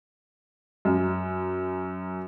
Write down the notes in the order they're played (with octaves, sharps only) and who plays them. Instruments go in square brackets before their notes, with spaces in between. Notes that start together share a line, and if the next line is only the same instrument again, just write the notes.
[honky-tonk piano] F#2